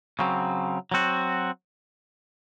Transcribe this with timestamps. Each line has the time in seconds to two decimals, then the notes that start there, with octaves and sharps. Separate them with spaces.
0.19 C#3 F#3 C4
0.91 F#3 C4 F#4